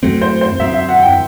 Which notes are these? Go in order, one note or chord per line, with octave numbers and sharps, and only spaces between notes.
F#2 F#3 A3 C4
C5
C5
F#2 F#3 A3 C4 E5
E5
F#5
G5